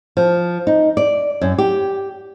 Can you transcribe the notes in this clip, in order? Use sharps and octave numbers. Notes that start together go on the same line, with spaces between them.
F3
D#4
D5
F#2
G4